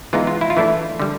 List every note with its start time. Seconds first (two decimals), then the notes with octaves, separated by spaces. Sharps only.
0.13 E3 G#3 B3 D#4 F4
0.27 F4
0.41 E4
0.50 F4
0.57 E3 A3 D4 E4
1.00 D3 G3